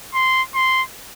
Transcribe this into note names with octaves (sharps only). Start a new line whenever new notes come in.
C6
C6